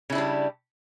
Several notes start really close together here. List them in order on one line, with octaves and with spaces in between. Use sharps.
C#3 E4 D4 G3